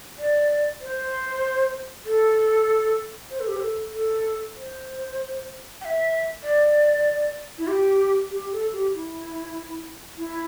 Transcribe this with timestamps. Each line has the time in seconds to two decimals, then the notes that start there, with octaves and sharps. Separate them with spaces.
0.19 D5
0.81 C5
2.06 A4
3.31 C5
3.40 A4
3.48 G4
3.57 C5
3.60 A4
3.94 A4
4.56 C5
5.81 G5
5.85 E5
6.43 D5
7.58 E4
7.68 G4
8.31 G4
8.52 A4
8.73 G4
8.94 E4
10.18 E4